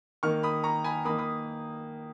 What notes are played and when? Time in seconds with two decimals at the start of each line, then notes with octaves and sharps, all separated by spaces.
0.23 D#3 A#3 C#6 F6
0.43 B5 D#6
0.64 A#5 C#6
0.84 G#5 B5
1.05 D#3 A#3 B5 D#6
1.18 B5 D#6